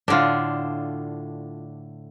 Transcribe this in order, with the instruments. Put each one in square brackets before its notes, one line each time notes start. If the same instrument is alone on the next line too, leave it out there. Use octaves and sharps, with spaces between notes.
[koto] A2 D3 [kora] D4 F4